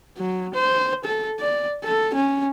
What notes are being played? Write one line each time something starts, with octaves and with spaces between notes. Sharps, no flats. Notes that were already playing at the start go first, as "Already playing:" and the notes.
F#3
C5
A4
D5
A4
C#4